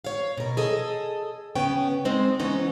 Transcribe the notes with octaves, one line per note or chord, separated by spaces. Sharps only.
C#5 F5
B2 A#4
G#4 A4 D#5
C#3 B3 C#4 G5
G#3 C4 D#4
C#3 E3 B3 C#4 D#4